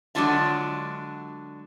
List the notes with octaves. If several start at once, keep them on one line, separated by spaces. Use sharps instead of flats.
D3 F#3 G#3 D4 F4 E5